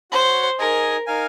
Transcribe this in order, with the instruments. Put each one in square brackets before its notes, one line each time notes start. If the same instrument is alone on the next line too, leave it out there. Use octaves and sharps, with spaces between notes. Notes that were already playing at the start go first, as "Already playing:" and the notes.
[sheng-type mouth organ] F#4 C#5 F#5 [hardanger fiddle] C5
[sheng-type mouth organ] D#4 G#4 D#5 G#5 [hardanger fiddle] A#4
[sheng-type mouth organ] D#4 A#4 F5 G#5